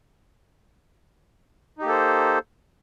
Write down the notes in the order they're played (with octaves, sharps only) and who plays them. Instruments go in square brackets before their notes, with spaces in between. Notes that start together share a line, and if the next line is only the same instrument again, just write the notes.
[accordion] D#4
G4
A#3
A4
C5